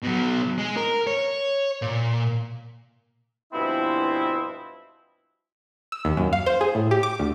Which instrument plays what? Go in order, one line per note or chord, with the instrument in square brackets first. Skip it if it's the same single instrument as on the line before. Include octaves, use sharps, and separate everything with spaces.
[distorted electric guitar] B2 F#3
G#3
A#4
C#5
A#2
[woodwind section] G2 B2 F3 G#3 C4 E4
[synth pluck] E6
D#2
F#2
F5
C5
G#4
A2
G4
D6
D2